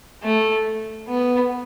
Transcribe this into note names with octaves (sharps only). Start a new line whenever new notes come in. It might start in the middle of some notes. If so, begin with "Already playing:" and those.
A3
B3